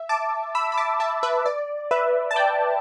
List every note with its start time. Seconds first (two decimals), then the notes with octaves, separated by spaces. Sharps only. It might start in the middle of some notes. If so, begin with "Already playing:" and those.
Already playing: E5
0.09 A5 D6
0.55 B5 E6
0.72 B5
0.77 A5 D6
1.00 E5 A5
1.23 B4 E5
1.46 D5
1.91 B4 E5
2.31 A5
2.36 D5 G5